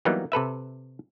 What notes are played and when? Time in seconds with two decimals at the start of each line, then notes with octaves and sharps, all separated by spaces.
0.05 E3 F#3 G3 A#3 B3 D#4
0.32 C3 A4 B4 E5